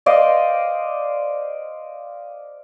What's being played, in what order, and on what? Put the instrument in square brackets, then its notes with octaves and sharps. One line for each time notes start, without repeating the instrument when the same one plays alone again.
[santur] C5 D5 D#5 F5